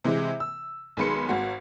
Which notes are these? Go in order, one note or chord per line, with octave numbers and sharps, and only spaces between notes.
C3 E3 G#3
E6
B1 D#3 G#3 B4 C6 C#7
G#1 F#4